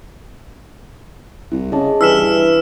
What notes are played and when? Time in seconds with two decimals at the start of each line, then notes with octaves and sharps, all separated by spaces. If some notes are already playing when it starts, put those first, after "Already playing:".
1.52 C2 E4
1.72 C#3 G#4 D#5 A5
2.01 G2 E3 E4 E6 F6 B6 E7